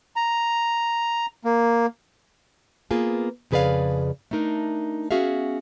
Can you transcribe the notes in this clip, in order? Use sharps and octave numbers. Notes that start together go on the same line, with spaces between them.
A#5
A#3
A#3 B3 F4 G#4
F2 C#3 G#4 B4 D5 F5
A3 D4 D#4 A#4
B3 C#4 F#4 G#4 E5 F5